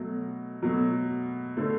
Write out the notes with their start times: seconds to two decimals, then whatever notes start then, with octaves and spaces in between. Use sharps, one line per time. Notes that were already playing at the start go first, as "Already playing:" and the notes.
Already playing: B2 F#3 A3
0.63 B2 F#3 A3
1.57 D3 A3